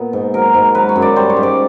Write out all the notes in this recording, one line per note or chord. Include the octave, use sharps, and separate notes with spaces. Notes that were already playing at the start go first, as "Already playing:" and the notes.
Already playing: A#2 B3
G#2
F#3 A#4
G#2
F#3 B4
C#5
F#2
D5
G3 C5
C#5
G#2
D5